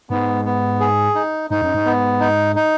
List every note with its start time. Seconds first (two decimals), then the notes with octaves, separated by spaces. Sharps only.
0.10 G#2 B3
0.45 B3
0.80 G#4
1.15 D#4
1.50 G#2 D#4
1.62 F#2
1.74 G#2
1.85 B3
2.20 D#4
2.56 D#4